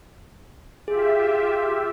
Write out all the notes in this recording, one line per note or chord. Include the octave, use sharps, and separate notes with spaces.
F4 G4 G#4 E5